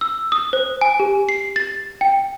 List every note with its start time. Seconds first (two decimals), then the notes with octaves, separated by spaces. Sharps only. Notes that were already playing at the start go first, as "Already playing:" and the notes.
0.01 E6
0.32 D#6
0.53 C5
0.81 G#5
1.00 G4
1.29 C7
1.56 A6
2.01 G5